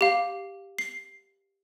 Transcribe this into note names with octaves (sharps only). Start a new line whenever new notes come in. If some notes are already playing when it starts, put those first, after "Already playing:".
G4 F5
C7